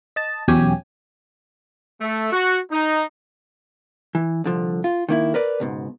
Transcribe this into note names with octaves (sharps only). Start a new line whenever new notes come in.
D#5 A5
E2 B2 F#3 C#4 G4 G#5
A3
F#4
D#4
E3
C2 D3 F3
F4
D#3 A#3 E4
A#4 B4 D5
C#2 G#2 B2